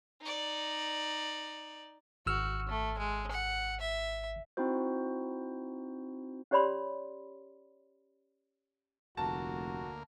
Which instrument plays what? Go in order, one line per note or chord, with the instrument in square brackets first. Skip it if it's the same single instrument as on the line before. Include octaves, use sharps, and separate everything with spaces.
[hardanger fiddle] D#4 D5
[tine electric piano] G#1 E6 F6 [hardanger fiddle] F#4
[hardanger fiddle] A3
G#3
F#5
E5
[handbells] C4 D#4 E4 F#4 C5
[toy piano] C#4 G4 C#5 D5 B5 C6
[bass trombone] F1 [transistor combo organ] D2 A#3 A#4 [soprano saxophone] F#4 [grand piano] A5